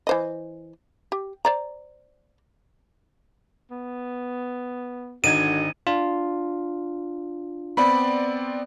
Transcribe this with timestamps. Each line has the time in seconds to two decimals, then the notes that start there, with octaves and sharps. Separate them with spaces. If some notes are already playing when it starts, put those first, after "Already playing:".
0.07 E3 C5 D#5
1.12 G4
1.45 C5 D5 A#5
3.71 B3
5.24 G#1 D3 D#4 F#4 G#6 D#7
5.87 D4 F4
7.77 B3 C4 D5 B5